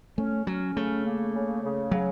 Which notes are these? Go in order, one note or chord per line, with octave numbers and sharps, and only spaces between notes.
A3 C#4
F#3 C#4
C#3 A3
A#3
C#3
C#3
C#3 F#3